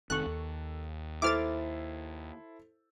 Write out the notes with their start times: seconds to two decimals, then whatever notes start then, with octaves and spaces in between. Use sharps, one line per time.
0.10 F1 D#3 C4 A4 C#6 F#6
0.26 D#2
1.22 E4 A4 C5 D6 F6 A6